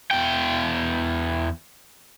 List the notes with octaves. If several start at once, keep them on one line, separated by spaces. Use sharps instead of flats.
E2 G5